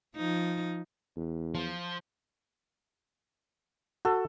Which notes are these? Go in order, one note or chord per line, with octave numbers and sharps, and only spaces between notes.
F3 D#4
E2
F3
F#4 A4